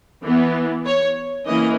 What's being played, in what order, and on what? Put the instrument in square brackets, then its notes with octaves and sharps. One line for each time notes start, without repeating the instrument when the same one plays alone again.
[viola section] E3 B3
C#5
E3 A#3 C#4 D#5